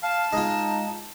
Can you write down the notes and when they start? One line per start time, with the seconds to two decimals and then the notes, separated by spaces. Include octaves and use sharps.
0.03 F5 A5
0.33 G#3 D#4 F4